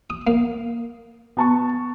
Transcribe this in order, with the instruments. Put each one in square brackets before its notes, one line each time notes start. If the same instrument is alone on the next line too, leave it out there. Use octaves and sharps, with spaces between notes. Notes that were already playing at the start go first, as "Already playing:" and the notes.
[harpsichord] D#6
A#3
[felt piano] B3 A5 C#6